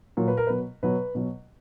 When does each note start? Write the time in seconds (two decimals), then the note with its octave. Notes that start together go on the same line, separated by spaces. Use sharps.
0.17 A#2 F#3
0.28 B4
0.37 A#4
0.47 B2 F#3 B4
0.83 B2 F#3 B4
1.15 B2 F#3